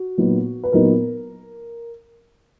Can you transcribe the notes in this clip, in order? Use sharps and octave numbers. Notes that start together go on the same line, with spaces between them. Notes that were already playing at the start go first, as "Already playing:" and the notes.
Already playing: F#4
A#2 F#3 B3 D#4
B4
A#2 F#3 B3 D#4 A#4